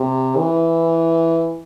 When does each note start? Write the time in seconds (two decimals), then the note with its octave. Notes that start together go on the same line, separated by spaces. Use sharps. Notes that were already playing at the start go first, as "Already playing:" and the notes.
Already playing: C3
0.38 E3